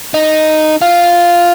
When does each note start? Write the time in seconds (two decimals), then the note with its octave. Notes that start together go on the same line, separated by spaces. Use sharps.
0.14 D#4
0.82 F4